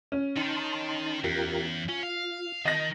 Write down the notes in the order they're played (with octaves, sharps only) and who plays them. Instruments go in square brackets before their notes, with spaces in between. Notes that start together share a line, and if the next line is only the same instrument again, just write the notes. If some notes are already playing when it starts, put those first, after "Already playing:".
[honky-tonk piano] C#4
[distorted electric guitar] D#3 [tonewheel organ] D#4 A5 C6
[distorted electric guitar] E2 [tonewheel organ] F4 G4 A#4
[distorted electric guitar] C#4 [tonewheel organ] F4
[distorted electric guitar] F5
[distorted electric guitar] D#3 [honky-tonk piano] D#5 A#6 [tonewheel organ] A5